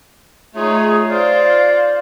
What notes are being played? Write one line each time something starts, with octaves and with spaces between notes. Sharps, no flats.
A3 D#4 F4 G#4 C#5
F4 C5 D5 F5